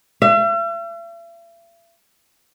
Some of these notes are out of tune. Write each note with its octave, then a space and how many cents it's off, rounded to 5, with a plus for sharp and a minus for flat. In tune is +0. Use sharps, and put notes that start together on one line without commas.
E5 +45